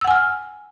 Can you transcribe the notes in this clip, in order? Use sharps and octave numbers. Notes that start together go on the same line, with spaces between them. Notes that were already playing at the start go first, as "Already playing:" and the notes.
F#5 G#5 E6 F6